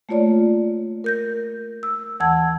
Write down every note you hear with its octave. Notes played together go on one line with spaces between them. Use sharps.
A3 A#3 F4 C#5 D5
A#4 G6 A#6
E6
D#2 E3 F#5 A5 E6 G#6